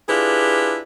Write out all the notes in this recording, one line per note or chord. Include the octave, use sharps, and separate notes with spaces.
D4 E4 F4 G4 G#4 B4